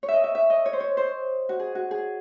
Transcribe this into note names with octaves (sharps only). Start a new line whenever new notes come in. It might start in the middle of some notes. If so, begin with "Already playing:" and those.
C#5
E5
D#5
E5
E5
D#5
C#5
C5
C#5
C5
F#4
G#4
F#4
G#4